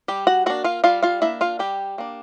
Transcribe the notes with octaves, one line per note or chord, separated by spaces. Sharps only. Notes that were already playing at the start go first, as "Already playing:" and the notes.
G3 G4 G5
F#4 F#5
A#3 D4 F#4 F#5
F4 F5
G3 F4 F5
F4 F5
A#3 D4 E4 E5
F4 F5
G3 G4 G5
A#3 D4